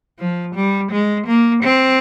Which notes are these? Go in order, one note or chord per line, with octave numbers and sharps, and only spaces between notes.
F3
G3
G#3
A#3
C4